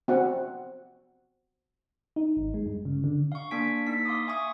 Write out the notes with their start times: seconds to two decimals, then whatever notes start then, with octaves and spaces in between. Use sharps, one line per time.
0.08 C4 F#4 F#5
2.16 D#4
2.37 G#1
2.54 G#3
2.66 G2
2.85 C#3
3.04 D3
3.32 F5 C#6
3.51 A#3 D4 G#5 B6 D7
3.87 A#3 D#4 E6 B6
4.05 F5 C6 D6 D#6
4.27 E5 G#5 C#6 D#6